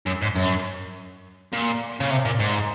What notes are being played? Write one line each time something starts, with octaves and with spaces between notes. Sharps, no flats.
F#2
G#2
F#2
A#2
C#3
C3
A#2
G#2